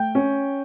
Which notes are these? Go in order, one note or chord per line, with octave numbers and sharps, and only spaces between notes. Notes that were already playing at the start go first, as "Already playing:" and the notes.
Already playing: A3 G5
C#4